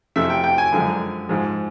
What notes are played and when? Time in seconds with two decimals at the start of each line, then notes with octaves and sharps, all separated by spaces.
0.16 F2 C3 E3 A3 E5
0.30 G5
0.44 G5
0.58 G#5
0.72 F#2 D3 F3 G#3
1.29 G#2 F3 G#3